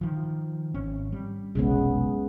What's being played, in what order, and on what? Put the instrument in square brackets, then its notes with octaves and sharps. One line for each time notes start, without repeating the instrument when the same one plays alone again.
[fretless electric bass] D#3 F3
G#1 C4 C#4
G3
[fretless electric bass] F1 B1 [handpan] C#3 G#3 B3